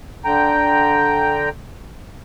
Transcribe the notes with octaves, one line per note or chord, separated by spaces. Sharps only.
D3 G5 A#5